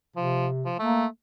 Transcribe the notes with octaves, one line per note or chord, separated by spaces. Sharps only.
C3 F3
F3
A3 A#3